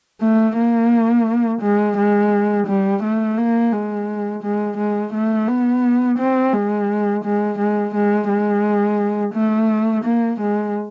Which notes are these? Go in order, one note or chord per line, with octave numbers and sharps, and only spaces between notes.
A3
A#3
G#3
G#3
G3
A3
A#3
G#3
G#3
G#3
A3
B3
C4
G#3
G#3
G#3
G#3
G#3
A3
A#3
G#3